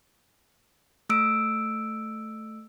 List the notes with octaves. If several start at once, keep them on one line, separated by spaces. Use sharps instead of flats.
A3 E6 D7